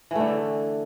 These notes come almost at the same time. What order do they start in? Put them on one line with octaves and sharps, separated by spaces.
E3 A3 D3